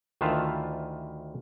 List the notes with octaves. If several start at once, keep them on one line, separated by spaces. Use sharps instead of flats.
D2 D#3 E3 F4 B4 A5